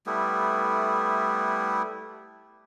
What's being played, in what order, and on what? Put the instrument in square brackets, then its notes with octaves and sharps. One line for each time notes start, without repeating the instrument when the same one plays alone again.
[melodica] G3 A3 B3 E4